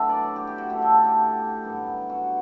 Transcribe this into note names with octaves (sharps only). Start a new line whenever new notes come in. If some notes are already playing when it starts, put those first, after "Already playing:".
Already playing: A2 F#3 B3 D4 E5 F#5
D5
C#5
G4
G4
F#4
D3 A3 C#4 G4
A4
A4
G4
G2 F#3 B3
F#4